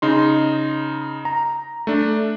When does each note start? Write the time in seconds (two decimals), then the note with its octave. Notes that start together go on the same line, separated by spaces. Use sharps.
0.02 C#3 D#4 C6
1.25 A#5
1.87 A3 D4